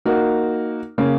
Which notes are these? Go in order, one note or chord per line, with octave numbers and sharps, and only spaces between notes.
A#3 D#4 F#4 A#4
C#3 A#3 C#4